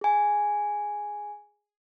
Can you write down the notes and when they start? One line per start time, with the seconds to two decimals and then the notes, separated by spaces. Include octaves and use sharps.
0.01 G#4 G#5